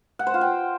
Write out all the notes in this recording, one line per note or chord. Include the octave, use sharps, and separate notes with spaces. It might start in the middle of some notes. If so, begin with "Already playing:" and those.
F#5
C5
F4
G5